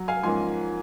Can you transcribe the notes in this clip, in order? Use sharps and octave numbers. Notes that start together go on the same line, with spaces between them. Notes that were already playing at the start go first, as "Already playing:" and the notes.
Already playing: F#3
F5 G#5
G#2 F3 A#3 C#4 G#5 C6